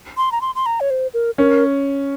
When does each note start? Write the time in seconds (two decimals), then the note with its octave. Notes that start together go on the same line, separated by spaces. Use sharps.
0.17 C6
0.32 A#5
0.41 C6
0.55 C6
0.66 A#5
0.80 C#5
0.90 C5
1.14 A#4
1.38 C#4 A#4